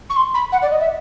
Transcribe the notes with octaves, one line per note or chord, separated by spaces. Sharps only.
C#6
C6
B5
F#5
D5
D#5
E5